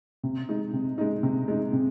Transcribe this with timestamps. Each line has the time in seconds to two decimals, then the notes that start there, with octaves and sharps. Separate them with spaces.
0.23 C3
0.49 G#3 D#4
0.73 C3
0.98 G#3 D#4
1.23 C3
1.48 G#3 D#4
1.73 C3